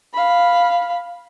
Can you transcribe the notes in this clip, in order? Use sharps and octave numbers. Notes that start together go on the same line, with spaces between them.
F5 B5